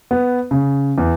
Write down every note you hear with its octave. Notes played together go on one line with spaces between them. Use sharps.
B3
C#3
E2